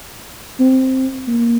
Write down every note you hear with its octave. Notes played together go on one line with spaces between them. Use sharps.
C4
A#3